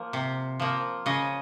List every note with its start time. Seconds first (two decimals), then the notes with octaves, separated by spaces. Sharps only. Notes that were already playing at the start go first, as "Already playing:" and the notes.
Already playing: F3 A#3
0.13 C3
0.60 F3 A#3
1.06 C#3 D#5